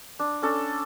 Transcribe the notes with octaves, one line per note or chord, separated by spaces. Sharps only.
D4
C#4 D4 A4